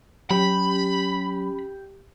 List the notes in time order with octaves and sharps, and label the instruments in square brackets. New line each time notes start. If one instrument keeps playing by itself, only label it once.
[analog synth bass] F#3 [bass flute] C#4 [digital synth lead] G4 [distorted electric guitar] B5